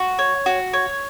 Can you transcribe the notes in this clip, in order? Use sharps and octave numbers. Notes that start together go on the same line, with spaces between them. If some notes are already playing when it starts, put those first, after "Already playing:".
Already playing: F#4
C#5
F#4
C#5